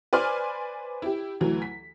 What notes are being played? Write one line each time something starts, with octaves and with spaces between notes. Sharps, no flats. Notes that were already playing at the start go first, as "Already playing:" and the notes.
B4 C5 D5 G#5 C6 F6
E4 G4
D2 E3 F#3
B6